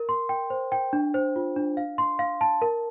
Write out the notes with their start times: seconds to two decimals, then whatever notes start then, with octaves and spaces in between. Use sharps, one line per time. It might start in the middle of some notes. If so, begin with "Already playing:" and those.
Already playing: A#4
0.09 C6
0.29 G5
0.50 C5
0.72 G5
0.93 D4
1.14 C5
1.36 F4
1.56 D4
1.77 F5
1.98 C6
2.19 F5
2.41 A5
2.62 A#4